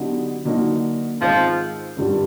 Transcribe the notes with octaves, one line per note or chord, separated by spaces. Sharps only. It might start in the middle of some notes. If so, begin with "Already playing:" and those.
Already playing: D3 F#3 B3 D#4 G4
D3 F#3 A#3 D#4 F#4
G#2 D#3 F3 G#3 C4 F4
G#1 G2 D3 G3